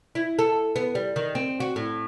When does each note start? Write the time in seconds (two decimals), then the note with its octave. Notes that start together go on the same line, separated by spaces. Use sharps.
0.15 E4
0.39 A4
0.76 B3
0.95 G3
1.16 D#3
1.35 C4
1.60 F#4
1.76 A2